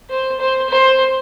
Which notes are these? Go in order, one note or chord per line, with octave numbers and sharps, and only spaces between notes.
C5
C5
C5